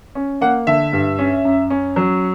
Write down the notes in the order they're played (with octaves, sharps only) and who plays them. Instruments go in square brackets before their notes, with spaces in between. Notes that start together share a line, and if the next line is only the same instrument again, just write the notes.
[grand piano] C#4
A#3 F#5
D3 E5
G2
C#4
F#2
C#4
F#3